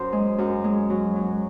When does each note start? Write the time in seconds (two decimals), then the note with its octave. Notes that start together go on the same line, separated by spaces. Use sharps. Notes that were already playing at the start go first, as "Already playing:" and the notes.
Already playing: F#2 C5
0.12 G#3
0.38 F#2
0.64 G#3
0.90 F#3
1.16 F#3